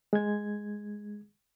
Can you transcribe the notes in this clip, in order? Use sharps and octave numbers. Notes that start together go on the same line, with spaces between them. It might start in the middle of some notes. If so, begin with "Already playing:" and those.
G#3 G#6